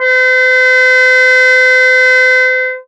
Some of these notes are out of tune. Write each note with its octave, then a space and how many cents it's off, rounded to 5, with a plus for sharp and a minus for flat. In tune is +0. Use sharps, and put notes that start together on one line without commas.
C5 -40